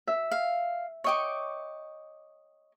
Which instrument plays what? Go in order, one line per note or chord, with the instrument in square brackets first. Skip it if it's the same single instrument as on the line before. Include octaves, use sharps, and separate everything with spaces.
[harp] E5
[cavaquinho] F5
[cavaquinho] C#5 D#5 D6 [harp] G5 C#6